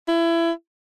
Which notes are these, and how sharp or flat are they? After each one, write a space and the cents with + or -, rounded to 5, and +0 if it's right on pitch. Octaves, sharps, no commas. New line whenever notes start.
E4 +25